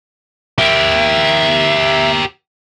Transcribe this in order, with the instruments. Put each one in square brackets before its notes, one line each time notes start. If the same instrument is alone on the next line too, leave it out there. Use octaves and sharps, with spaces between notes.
[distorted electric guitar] G4 A#4 [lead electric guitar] E5